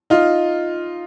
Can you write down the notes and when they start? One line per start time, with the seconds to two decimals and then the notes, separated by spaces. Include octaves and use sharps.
0.10 D#4 F4